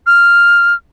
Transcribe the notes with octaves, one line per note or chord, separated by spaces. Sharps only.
F6